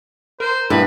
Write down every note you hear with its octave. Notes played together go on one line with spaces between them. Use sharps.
A#4 C5
G2 B3 E4 B4